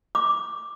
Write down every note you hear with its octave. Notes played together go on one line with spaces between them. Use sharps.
D6